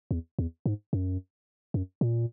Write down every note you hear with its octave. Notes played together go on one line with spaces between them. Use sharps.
E2
E2
G#2
F#2
F#2
A#2